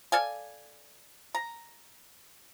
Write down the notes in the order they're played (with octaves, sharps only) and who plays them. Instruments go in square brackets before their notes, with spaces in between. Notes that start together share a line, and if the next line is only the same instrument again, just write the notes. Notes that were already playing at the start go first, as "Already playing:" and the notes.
[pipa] A4 D5 F5 G#5
A#5